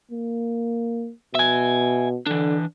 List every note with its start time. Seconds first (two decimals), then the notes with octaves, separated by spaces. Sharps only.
0.11 A#3
1.35 B2 E5 G#5
2.26 D3 E3 D4